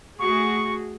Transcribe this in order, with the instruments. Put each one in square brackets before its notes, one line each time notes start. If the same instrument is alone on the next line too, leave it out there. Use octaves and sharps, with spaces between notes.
[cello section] A3 F#4 G#4 [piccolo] C#6